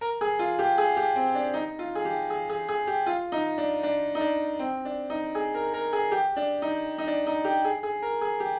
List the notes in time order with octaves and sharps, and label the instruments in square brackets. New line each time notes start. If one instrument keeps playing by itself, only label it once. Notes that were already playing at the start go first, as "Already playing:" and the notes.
[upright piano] A#4
G#4
F4
G4
G#4
G4
C4
D4
D#4
F4
G#4
G4
G#4
G#4
G#4
G4
F4
D#4
D4
D4
D#4
D4
C4
D4
D#4
G#4
A#4
A#4
G#4
G4
D4
D#4
D#4
D4
D#4
G4
G#4
G#4
A#4
G#4
G4